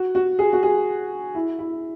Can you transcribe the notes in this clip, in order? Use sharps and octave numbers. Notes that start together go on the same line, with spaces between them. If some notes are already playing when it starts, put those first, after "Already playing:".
Already playing: F#4
F#4
G#4
F#4
G#4
E4
E4